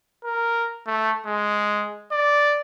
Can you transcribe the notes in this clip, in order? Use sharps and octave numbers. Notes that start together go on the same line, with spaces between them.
A#4
A3
G#3
D5